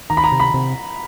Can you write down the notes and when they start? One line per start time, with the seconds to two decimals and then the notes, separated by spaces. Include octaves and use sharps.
0.10 D#3 A#5
0.17 B5
0.24 A#5
0.32 C3
0.40 B5
0.54 C3